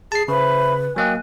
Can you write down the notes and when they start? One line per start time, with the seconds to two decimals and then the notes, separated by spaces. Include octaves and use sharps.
0.12 G#4 A5 C7
0.28 C#3 B4 C5 E5 B5
0.96 F#3 A#3 D#5 G5 G#5 F#6